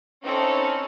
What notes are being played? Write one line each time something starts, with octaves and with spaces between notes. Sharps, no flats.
C4 C#4 D#4 E4 A4 C#5